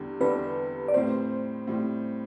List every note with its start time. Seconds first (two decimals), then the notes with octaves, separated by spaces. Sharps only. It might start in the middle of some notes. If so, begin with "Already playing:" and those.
Already playing: E2 D3 G3 D4 G4
0.20 E2 D3 G3 D4 A4 B4
0.88 D5
0.94 A2 G3 C4 C5
1.67 A2 G3 C4